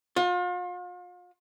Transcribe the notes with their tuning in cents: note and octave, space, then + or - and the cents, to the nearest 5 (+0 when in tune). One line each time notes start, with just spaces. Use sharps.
F4 +40